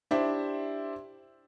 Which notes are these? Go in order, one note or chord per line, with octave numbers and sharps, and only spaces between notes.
D4 E4 G4 C5 E5